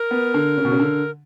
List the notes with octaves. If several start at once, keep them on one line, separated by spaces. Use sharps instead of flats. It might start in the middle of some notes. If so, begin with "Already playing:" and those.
Already playing: A#4
B3
D3
C#3
B2
C#3
D3